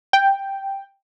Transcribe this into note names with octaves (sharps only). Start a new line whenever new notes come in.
G5